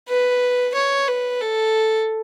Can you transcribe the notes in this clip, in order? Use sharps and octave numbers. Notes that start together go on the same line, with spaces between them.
B4
C#5
B4
A4